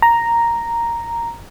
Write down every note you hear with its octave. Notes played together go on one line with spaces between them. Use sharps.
A#5